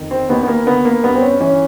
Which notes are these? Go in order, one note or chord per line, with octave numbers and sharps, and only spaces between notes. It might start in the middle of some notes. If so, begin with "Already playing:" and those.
Already playing: F2 D#3
C4
D#2 B3
B3
A#3
D3 B3
A#3
G2 B3
C4
C#4
E3 C#4